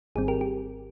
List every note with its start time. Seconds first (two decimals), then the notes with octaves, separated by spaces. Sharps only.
0.15 G#1 G#2 D#3 G3 C4 G#4
0.28 G4 A#4
0.41 G4